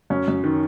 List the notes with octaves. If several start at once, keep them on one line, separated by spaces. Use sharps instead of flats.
F#2 C#4
F#2
D#3